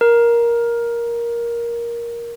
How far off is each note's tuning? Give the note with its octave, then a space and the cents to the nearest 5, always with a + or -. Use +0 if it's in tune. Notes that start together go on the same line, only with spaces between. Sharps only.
A#4 +10